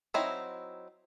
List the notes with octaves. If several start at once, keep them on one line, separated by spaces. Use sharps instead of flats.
F#3 C4 D#4 E4